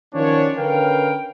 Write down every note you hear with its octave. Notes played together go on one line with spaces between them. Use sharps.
D#3 F3 F#3 C#4 D4 C#5
D3 C#4 A#4 B4 F5 G5